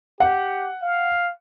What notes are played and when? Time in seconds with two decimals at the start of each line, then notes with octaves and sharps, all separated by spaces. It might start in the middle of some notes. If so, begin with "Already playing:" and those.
0.20 G4 F#5
0.82 F5